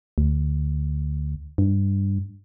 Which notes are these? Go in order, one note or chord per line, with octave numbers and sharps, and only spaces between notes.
D2
G2